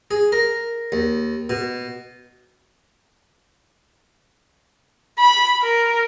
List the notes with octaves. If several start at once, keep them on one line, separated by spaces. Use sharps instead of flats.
G#4
A#4
D#2
B2
B5
A#4